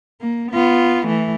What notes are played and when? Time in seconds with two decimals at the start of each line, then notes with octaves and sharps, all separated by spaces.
0.21 A#3
0.52 B3 F4
1.07 E3 A3